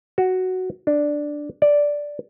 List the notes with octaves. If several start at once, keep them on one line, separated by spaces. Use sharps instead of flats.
F#4
D4
D5